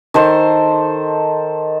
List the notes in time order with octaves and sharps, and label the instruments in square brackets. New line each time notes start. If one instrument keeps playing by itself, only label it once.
[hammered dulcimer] D#3 A4 C5